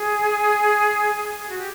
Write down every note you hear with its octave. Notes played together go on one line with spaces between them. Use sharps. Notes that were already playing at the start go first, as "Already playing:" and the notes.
Already playing: G#4
G#4
F#4
G4